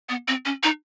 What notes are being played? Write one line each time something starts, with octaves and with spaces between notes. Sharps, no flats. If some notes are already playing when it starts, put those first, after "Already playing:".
B3
C4
C#4
D#4